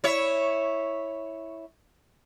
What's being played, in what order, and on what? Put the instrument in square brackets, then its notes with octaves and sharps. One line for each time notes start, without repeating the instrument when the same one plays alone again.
[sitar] E4 C#5 E5